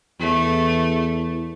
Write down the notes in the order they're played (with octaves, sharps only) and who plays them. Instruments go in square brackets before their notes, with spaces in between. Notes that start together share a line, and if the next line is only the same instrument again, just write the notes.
[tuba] E2 [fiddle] A3